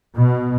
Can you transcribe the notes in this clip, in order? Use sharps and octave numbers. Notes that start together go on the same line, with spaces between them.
B2